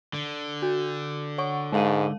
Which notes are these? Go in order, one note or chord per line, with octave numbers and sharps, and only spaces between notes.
D3
F#4
C#5 F#5 C#6
G#2 G#3 F5 D#7